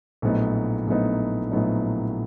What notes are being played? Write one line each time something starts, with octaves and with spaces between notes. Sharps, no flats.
A#1 A2 F#3 B3 D#4
A#1 A2 F#3 B3 D#4
A#1 A2 F#3 B3 D#4